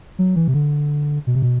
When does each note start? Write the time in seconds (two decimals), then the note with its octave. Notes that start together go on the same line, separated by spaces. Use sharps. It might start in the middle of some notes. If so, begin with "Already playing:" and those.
0.19 F#3
0.36 E3
0.48 C3
0.54 D3
1.27 B2
1.35 C3
1.42 B2